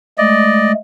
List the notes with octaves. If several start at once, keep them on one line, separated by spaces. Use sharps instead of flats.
G#3 A3 D5 D#5